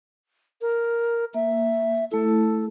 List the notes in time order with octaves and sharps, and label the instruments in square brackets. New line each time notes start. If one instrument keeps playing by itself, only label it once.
[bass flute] A#4
[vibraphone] A#3 [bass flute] E5
[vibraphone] A3 E4 [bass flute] A4